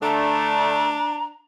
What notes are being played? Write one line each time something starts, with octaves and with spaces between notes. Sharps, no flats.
D3 A3 D4 A#5